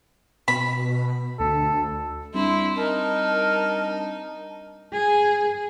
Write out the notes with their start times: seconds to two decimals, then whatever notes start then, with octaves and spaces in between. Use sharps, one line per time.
0.48 B2 B5
1.39 D2 A4
2.34 G3 C4 D4 E4 C6
2.77 D#4 A#4 A5
4.93 G#4